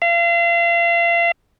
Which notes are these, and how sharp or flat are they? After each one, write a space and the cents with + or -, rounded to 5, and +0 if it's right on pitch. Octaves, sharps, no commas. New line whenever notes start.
F5 -35